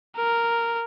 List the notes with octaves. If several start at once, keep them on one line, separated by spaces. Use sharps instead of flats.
A#4